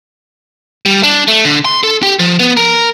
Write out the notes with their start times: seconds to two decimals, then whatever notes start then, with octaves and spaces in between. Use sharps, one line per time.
0.86 G3
1.03 D4
1.28 A3
1.45 D3
1.65 C6
1.83 A4
2.03 G4
2.19 F3
2.40 B3
2.57 A#4